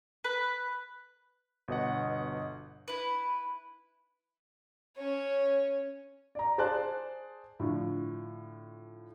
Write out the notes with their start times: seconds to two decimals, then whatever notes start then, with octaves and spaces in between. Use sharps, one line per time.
0.24 B4
1.68 G1 B2 D#5 F#5
2.88 E4 B4
4.97 C#4 C#5
6.35 D5 A#5
6.58 G#4 C5 D5 A5 C6 F#6
7.60 A2 D3 F3